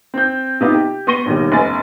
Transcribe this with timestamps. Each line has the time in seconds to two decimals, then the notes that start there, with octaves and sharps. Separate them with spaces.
0.14 C4 G6
0.60 C3 B3 D#4 F4
0.74 G4
1.07 B3 C6 C#6 A#6 D#7 G7
1.26 A#1 D#2 B2 D#3 G3
1.52 F1 C#3 B3 G#5 A6